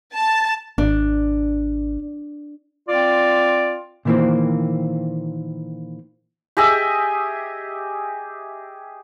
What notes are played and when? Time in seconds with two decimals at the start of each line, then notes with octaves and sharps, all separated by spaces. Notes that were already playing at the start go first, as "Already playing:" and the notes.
0.14 A5
0.78 G#1 D4
2.88 C4 F4 D5
4.05 A#2 D#3 E3 A3 A#3 C4
6.57 G4 G#4 D#5 E5